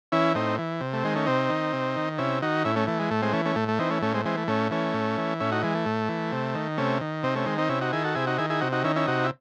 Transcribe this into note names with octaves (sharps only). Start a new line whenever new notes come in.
E3 C#4 E4
A2 C4 D#4
E3
C3
A3
D#3 G#3 C4
A3 C#4
C3 C4 D#4
D#3
C3
D#3
C3 C#4 E4
D#3 D#4 F#4
A2 C#4 E4
A3 C#4
E3 A3
G#3
A2 A3
G#3 C4
E3 A3 C#4
A3 C#4
A2 A3
A3
E3 C4 D#4
A3 C#4
A2 A3 C#4
G#3 C4
E3 G#3 C4
A3
A2 A3 C#4
E3 A3 C#4
A2
E3
A2 C#4 E4
D#4 F#4
E3 G#3
A3
A2
E3
C3
D#3
C3 A3 C#4
D#3
C3 C4 D#4
A3 C#4
D#3 G#3 C4
C4 D#4
C3 C#4 E4
D#4 F#4
D#3 E4 G#4
F#4 A4
C3 E4 G#4
D#4 F#4
D#3 E4 G#4
E4 G#4
C3 D#4 F#4
D#4 F#4
D#3 C#4 E4
C#4 E4
C3 D#4 F#4
E4